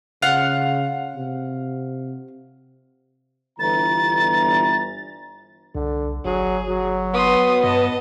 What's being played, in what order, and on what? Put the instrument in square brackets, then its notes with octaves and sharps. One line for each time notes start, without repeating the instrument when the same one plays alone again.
[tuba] C#3 [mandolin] F4 F5 F#5
[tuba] C3
[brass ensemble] G1 E3 A#5 [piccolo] A6
[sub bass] C2 [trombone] D3
[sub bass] G1 [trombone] F#3 [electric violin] G#4
[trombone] F#3
[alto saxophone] B3 [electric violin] C6 D#6
[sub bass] G2 [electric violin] D#5 A5